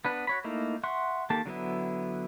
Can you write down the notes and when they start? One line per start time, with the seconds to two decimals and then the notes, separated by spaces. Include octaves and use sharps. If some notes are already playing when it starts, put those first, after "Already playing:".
0.05 B3 D4 B4
0.27 F#4 C#5 B5
0.44 A3 A#3 D#4 E4
0.83 E5 F#5 C6 C#6 F#6
1.30 D#3 A#3 G4 A4 A5
1.46 D3 F#3 B3 E4